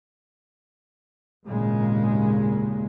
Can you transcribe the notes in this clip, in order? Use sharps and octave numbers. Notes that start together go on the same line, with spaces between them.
G#1 D#2 A#2 C#3 G#3